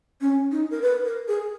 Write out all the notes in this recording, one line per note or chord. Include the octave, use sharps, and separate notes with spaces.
C#4
D#4
A#4
B4
A#4
G#4